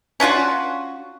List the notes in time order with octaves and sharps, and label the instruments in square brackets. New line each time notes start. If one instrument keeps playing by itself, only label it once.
[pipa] C#4 D4 F4 F#4